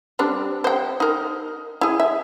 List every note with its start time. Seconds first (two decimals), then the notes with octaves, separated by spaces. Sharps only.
0.19 G3 C4 D4
0.64 C5 G5
1.00 D#4 A#4
1.81 E4 G#4
2.00 E5